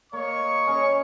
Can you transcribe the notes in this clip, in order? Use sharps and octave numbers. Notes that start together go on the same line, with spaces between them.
A#3 C#5 D#5 C#6
C#4 G#4 B5